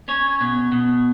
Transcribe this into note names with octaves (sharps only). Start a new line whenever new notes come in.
C#4 C#5
B2
B2